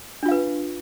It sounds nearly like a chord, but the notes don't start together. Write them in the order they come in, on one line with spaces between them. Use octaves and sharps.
D4 F4 F5 B4